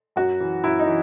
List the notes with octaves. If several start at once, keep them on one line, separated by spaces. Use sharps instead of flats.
F#2 F#4
E3
F#2 E4
D#4
E3